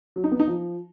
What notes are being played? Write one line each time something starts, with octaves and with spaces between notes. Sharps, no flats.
F#3
D#4
B3
D#4
F3